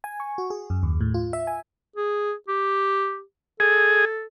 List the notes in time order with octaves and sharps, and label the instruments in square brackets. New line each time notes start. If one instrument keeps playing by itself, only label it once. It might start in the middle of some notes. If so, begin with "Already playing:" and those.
[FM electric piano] G#5
C#6
F#4
G#4
F#2
D#2
A2
F4
E5
G#5
[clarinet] G#4
G4
[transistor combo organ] G#4 [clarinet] A4